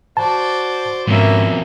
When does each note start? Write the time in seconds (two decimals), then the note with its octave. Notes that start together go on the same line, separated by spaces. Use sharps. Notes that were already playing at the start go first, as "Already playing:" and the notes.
0.17 F#4 C5 D5 A5
1.07 F2 G#2 B2 A#3 C#4 E5